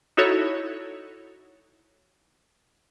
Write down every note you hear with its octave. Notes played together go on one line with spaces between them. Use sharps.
D#4 E4 F#4 A4 C#5